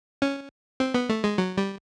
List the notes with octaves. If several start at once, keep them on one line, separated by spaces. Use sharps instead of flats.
C#4
C4
B3
A3
G#3
F#3
G3